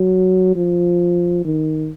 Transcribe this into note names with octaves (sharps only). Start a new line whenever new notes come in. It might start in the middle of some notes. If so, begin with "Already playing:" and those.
Already playing: F#3
F3
D#3